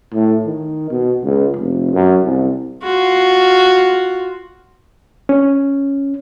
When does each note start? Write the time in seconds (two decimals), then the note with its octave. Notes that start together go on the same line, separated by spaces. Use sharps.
0.13 A2
0.46 D#3
0.90 B2
1.24 C#2
1.56 F1
1.93 F#2
2.24 C2
2.83 F4 F#4
5.29 C#4